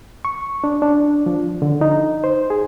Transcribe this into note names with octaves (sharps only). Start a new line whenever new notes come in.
C#6
D4
D4
F3
D3
D#4
C5
G#4